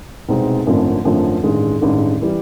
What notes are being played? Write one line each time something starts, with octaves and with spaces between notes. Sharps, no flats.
C2 B2 G#3 C4 D#4
G#1 F#2 D3 F3 A3
G#1 F#2 D3 F3 A3
A1 G2 D#3 G#3
A1 G2 D#3 G#3
E3 G3